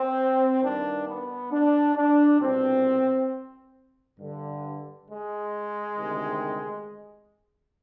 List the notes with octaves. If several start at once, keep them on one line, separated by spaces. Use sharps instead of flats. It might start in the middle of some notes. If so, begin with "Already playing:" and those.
Already playing: C4
G2 D#3 D4
B3
D4
D4
C2 B2 C4
G2 D3
G#3
D2 C3 D#3